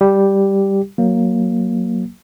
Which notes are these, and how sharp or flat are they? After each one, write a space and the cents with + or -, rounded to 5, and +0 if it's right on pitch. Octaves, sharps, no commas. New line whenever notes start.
G3 +0 G4 +0
F#3 +0 A#3 +0